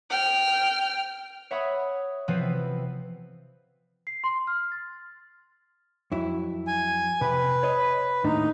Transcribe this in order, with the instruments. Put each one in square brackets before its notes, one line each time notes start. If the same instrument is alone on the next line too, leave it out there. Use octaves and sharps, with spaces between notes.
[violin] G5 F6
[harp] C#5 E5 F#5 B5 C#6 D#6
C3 E3 F3 B3 C4 B4
[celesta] C7
C6
F6
A6
[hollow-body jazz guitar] F2 F#3 E4
[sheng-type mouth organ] G#5
[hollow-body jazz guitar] C3 [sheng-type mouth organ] B4
[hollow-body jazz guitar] C#5 D#5
[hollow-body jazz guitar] D#2 A2 D4 [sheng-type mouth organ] D#4